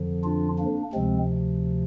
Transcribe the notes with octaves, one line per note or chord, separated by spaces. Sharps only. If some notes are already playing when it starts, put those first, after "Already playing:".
Already playing: F2 D3 F3
D4 F4
A#3 D4
D2 C3 F3 G#3 C4